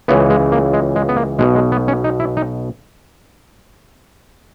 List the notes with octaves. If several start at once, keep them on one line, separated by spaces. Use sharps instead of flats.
C#2 C#3 E3 B3
G#3
A#3
G#3
G#3
B3
A#3
B1 B2 G#3
G#3
B3
C#4
D#4
E4
D#4